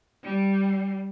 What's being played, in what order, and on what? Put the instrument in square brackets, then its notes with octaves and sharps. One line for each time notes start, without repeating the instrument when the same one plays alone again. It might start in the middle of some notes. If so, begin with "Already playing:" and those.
[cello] G3